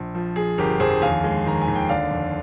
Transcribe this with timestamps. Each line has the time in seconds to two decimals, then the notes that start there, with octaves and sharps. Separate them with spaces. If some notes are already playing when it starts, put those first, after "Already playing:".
Already playing: A#1
0.15 F3
0.36 F3 G#4
0.58 G1 G4 A#4
0.80 F2 G#4 C5
1.02 D#2 F5 G#5
1.24 G#3
1.45 D#3 A#5
1.62 G#5
1.68 D#2
1.75 G5
1.89 D3 D5 F5
2.11 F2